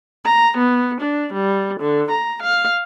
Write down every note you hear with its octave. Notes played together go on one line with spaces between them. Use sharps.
A#5
B3
D4
G3
D3
A#5
F5